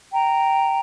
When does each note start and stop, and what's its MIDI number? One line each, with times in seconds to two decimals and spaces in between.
0.13 0.80 79
0.13 0.80 82